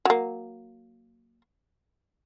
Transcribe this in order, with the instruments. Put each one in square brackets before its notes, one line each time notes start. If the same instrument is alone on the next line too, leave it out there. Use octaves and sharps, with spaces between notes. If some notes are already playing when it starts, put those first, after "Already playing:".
[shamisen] F#3 A#3